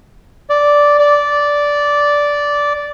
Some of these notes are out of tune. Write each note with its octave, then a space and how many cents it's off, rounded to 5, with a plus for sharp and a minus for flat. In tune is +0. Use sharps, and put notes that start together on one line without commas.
D5 -5
D5 -10